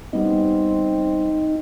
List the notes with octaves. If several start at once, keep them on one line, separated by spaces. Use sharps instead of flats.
G3 B3 C4 D#4